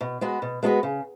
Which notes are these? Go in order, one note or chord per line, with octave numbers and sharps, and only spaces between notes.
B2
G#3 B3 F#4 B4
B2
G#3 B3 F#4 B4
C#3